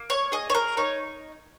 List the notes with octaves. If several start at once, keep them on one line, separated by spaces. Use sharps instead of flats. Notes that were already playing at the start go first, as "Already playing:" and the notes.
Already playing: A#3
C#5
G#4 D#5
C#5
A#4
D#4 C#5